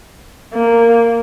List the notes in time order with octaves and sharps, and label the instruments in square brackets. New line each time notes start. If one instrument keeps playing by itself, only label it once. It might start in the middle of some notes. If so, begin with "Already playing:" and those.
[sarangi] A#3